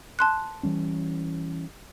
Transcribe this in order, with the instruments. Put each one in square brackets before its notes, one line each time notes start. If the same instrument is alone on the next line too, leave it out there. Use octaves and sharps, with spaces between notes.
[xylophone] A5 C6 F#6
[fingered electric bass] E3 G3 C#4